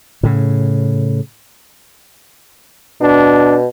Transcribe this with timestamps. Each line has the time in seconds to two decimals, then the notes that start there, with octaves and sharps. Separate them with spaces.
0.23 A2 C#3
3.01 B2 D4